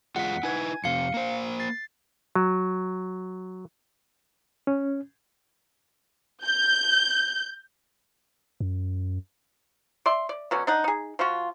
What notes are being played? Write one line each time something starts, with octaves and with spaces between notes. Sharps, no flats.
E2 G#3 F4 F#5 B6
D#4 E4 B4 G#5 G#6
F2 C3 F5 C#7
A#3 C5
A6 C7
F#3
C#4
G6
F#2
D5 E5 C6
D5
B2 D3 F#3 C#4
D4 D#4 F#5
D#4 G#4
F3 F4 F#4